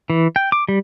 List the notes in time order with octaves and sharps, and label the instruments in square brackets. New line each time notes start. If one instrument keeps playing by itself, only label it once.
[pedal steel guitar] E3
G5
D6
G3